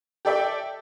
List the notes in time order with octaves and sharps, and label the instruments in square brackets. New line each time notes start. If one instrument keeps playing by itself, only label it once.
[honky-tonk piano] G4 A4 D5 E5 G5